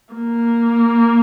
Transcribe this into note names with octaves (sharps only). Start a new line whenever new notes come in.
A#3